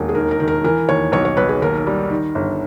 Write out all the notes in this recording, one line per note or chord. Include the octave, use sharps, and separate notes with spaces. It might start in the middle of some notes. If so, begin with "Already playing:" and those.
Already playing: E1 D#2
G#4
D#3 A#4
A#4
D#3
A#4
E3 A#4
D#2 C#5
B1 C#5
C#5
B1 B4
G#4
D#2 A#4
G3
D#3
G1